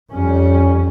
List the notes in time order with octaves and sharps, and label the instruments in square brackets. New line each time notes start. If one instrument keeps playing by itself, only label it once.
[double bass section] F2 G3 C#4